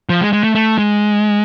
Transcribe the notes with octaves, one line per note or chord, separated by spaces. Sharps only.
F3
G#3
G#3
A3
A3
G#3